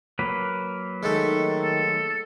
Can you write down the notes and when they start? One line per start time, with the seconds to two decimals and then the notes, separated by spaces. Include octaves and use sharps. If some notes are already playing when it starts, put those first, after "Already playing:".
0.19 F#3 A#3 B4
1.03 D#3 G#3 A3 A4
1.62 A4